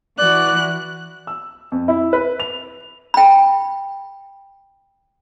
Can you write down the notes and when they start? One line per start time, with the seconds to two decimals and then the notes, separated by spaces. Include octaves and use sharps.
0.18 E3 F#4 D5 F#6
1.27 E6
1.72 F2
1.88 E4
2.13 B4
2.40 F7
3.14 G5 B5